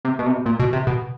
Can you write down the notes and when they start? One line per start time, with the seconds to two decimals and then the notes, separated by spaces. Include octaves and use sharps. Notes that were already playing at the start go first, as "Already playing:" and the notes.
0.05 C3
0.19 B2
0.26 C3
0.32 B2
0.46 A#2
0.60 B2
0.73 C3
0.87 B2